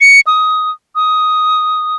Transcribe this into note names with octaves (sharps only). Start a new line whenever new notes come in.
C#7
D#6
D#6